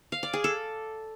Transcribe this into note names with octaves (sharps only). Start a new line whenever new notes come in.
F5
D5
G#4
A4